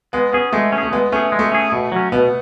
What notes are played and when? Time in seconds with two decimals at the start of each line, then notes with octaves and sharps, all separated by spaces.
0.13 G#3 B3
0.33 B3 C#4 G#4
0.52 G#3 A3
0.72 C#4
0.78 G#4
0.83 A3
0.92 G#3 B3
1.12 A3 C#4 G#4
1.32 G#3
1.39 A3
1.52 C#4 G#4
1.72 B2
1.92 F#3 C#4
2.12 B2 B3